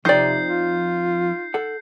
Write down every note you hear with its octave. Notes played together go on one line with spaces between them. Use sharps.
F2 C3 F3 D#4 D5 G5 G6 C7
F4
A4 F#5